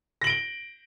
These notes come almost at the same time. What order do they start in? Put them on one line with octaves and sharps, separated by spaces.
A#6 F#7 D7 G7